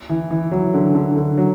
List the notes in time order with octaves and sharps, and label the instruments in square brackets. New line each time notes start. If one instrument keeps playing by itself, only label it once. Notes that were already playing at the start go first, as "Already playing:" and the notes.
[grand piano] E3
E3
F#3
D3
D3
D3
F#3